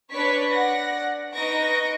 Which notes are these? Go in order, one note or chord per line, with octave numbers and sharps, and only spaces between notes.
D4 B4 C#5 D5 C#6 B6
D5 F#5 A#6
D#4 B4 D#5 C#6 A#6 D7